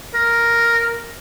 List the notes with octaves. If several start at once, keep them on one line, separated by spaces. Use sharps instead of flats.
A#4